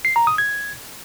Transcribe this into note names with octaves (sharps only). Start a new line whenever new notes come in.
C7
A#5
D#6
G#6